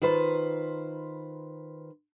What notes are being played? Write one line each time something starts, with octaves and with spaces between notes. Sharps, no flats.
D#3 F4 B4 C5